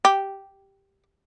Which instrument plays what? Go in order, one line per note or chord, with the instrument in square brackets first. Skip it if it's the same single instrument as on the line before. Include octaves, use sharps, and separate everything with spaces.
[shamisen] G4